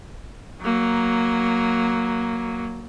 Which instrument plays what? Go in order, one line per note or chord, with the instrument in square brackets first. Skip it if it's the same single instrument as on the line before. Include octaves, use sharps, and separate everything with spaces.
[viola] F#3 A#3